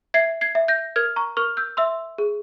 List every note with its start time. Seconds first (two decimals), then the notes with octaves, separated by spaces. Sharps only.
0.14 E5 G#6 C7
0.41 G#6 C7
0.55 E5
0.68 G6 A#6
0.96 A#4 F6 G#6
1.16 A#5 C#6
1.37 A#4 C#6 F6
1.57 E6 G6
1.77 E5 C6 E6
2.18 G#4